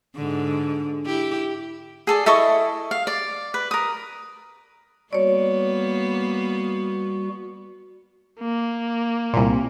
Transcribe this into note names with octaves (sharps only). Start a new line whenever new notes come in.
G#2 D3
E4 G4
G#4 A4 D5
E4 A4 D#5 C#6
F5
D5
B4
A#4 D#6
G3 A#3 B3 F#4 C#5 D5
A#3
C2 A#2